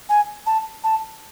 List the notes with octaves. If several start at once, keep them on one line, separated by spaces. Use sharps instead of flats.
G#5
A5
A5